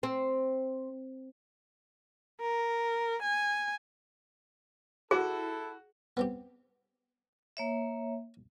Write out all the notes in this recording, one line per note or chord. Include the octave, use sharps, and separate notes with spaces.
C4
A#4
G#5
E4 F#4 G#4 A4
B3 C4 G4
A#3 C#5 E5